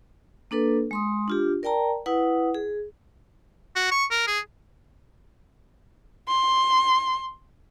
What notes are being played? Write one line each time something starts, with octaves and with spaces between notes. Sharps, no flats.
A#3 D4 A4 B4
G#3 C6 D#6
D4 F4 G4
A#4 D5 G5 A5 A#5
E4 B4 F#5 D#6
G#4
F#4
C#6
A#4
G#4
C6